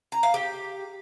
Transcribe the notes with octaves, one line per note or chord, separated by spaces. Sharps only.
A#5
F5
G4